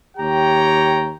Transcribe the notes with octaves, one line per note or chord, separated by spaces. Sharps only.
D#2 G4 C#5 G5 A#5